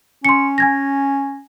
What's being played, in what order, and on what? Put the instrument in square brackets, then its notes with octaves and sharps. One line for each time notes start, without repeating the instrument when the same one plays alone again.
[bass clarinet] C#4 [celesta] C6 C#7
[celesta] G#5 G#6 A#6